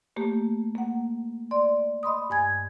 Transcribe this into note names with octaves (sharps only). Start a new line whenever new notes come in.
A3 A#3 G4
A#3 F#5
D5 C6
D#5 B5 C6 D#6
G2 G#5 G#6